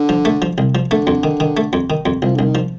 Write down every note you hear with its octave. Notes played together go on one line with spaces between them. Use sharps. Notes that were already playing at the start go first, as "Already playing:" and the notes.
Already playing: D3
F3
A3
F3
C2
F3
D3 A3
F2
D#3
D#3
A3
F2
D#3
F2
C2 F3
C2 D3
D#3
F3